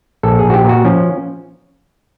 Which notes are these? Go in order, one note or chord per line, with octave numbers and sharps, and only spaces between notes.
A#1 A4
G#4
A#1
F#4
G4
A#2 F#4
F3 C#4